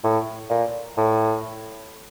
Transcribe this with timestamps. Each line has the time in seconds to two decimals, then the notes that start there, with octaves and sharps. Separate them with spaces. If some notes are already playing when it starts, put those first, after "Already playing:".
0.04 A2
0.50 A#2
0.97 A2